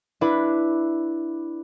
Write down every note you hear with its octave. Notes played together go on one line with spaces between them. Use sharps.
D4 E4 B4